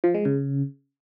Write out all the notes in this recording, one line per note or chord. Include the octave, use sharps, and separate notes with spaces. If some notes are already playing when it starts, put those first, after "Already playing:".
F3
G#3
C#3